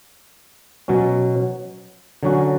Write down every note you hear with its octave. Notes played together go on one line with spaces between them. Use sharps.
B2 F#3 C#4
D3 F#3 C#4 F#4